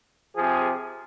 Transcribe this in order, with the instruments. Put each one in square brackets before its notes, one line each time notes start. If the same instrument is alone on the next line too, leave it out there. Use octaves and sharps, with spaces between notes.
[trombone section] C3 F3 G#4